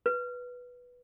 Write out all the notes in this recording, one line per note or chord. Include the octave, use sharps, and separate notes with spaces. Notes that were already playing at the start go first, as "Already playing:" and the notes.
B4